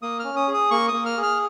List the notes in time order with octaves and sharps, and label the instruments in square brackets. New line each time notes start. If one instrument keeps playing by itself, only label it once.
[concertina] A#3 D#6
C#4 F6
D#6
G#4
D#6
A#3 C#6
D#6
A#3
F6
G#4
F6